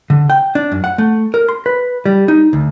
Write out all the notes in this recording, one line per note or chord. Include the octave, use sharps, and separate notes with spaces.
D3
G5
D4
F#2
F#5
A3
A#4
C6
B4
G3
D#4
D2